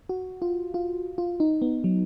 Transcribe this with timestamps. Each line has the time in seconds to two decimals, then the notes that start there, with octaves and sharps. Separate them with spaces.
0.09 F#4
0.42 F4
0.74 F4
1.18 F4
1.40 D#4
1.62 B3
1.84 F#3